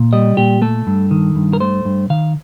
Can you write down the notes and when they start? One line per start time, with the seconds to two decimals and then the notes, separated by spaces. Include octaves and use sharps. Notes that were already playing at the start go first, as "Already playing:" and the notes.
Already playing: A#2
0.13 G3 D#5
0.37 A#2 G4
0.62 A3 A4
0.87 G2
1.11 D#3
1.36 G2
1.53 A#4
1.60 A3 C5
1.85 G2
2.10 D#3 F5